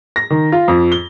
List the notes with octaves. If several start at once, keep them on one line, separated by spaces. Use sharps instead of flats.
A#6
D#3
F4
F2
G7